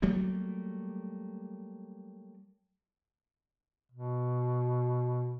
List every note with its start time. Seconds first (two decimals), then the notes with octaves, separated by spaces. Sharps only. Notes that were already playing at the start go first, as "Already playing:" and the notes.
0.02 F#3 G3 A3 A#3
3.92 B2